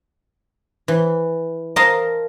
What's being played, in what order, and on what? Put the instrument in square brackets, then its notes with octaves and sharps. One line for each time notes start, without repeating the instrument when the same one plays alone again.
[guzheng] E3
A#4 D#5 F5 A5 C6